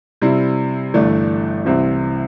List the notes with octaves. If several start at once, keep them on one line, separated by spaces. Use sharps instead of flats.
C3 G3 C4 E4
G1 G2 E3 A3 D4
C2 C3 E3 C4